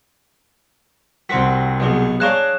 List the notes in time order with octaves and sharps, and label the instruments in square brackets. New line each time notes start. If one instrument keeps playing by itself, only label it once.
[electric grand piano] C2 B6 [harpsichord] C4 F#4
[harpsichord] B1 B2 [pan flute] G#4
[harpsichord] D4 F5 A#5 [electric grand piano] G#4 C#6 [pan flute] C#5 [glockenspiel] F#6 E7